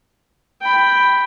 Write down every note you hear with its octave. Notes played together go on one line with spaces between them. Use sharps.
G5 B5